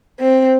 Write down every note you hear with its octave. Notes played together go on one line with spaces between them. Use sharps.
C4